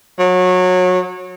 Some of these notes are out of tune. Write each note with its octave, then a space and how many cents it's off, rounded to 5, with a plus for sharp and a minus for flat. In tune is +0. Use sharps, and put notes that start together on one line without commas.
F#3 -25